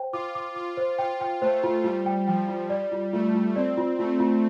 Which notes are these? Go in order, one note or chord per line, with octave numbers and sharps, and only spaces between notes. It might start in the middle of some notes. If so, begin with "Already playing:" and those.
Already playing: C5 G5
F4 D6
D6
F4 D6
C5
F4 G5
G5
A3 C5
F4
G3 F4
G5
F3 G5
F4
G3 D5
F4
A3 F4
F4
C4 D5
F4
A3 F4
F4